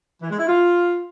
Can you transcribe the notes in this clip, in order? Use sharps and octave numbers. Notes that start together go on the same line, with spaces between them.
E3
G#3
E4
F4